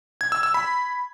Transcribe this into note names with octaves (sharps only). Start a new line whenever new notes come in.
G#6
E6
E6
B5